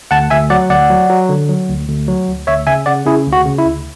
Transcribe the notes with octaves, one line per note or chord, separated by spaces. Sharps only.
D2 F#5 A5
D2 E5 G#5
F#3 D5 F#5
D2 D5 F#5
F#3
F#3
D3
F#3
D2
D2
F#3
D2
D2 C#5 E5
C#3 E5 G#5
C#3 D5 F#5
C#3 E4 G#4
D2
F#4
C#3
E4
D2